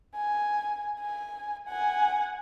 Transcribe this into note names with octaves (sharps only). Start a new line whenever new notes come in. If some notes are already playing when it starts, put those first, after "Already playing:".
G#5
G#5
F#5 G#5